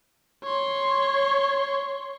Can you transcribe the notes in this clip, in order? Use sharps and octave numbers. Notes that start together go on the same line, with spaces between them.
C#5 C6